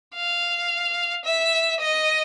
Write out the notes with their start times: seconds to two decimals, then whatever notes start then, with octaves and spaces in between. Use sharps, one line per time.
0.15 F5
1.25 E5
1.80 D#5